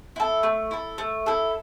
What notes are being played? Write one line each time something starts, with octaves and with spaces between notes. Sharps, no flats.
E4 A4
A3
E4 A4
A3
E4 A4